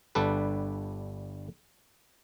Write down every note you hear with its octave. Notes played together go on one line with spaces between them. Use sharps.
G1 G3 D4 A4 B4